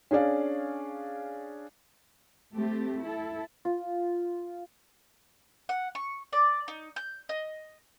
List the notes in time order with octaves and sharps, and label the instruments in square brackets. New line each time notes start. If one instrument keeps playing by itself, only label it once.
[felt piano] C#4 D4 G#4 D5 F5
[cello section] A3 C4 G4
E4 A4
[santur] F4
[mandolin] F#5
C#6
D5
D#4
G6
D#5